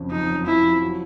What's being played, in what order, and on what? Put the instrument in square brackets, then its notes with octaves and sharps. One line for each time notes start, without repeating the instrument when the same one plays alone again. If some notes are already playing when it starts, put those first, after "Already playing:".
Already playing: [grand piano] F#1 F2 C#3 F3
[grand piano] F3 [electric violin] D#4
[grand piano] F#1
[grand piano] F3 [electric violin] E4
[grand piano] F3
F#3